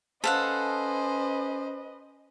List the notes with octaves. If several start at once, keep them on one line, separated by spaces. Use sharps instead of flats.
C#4 A4 B4 C5 D#5 F5 F#5